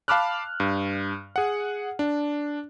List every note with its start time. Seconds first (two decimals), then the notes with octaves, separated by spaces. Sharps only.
0.08 F5 A5 B5 D6 F6 F#6
0.60 G2
1.36 G#4 F#5
1.99 D4